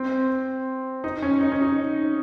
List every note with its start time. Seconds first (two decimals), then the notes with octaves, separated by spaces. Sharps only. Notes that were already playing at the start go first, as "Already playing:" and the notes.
Already playing: C4
1.04 D#4
1.22 C#4
1.41 D#4
1.52 C#4
1.62 D#4